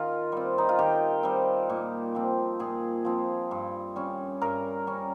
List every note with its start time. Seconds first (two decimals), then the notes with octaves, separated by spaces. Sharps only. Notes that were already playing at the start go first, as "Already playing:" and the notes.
Already playing: D#3 F4
0.32 G3 C4
0.58 D#4
0.69 F4
0.79 D#3 G4
1.23 G3 C4
1.70 A#2
2.15 F3 C4
2.60 A#2 G#4
3.05 F3 C4
3.51 G2
3.96 G3 C#4
4.41 G2 A#4
4.87 G3 C#4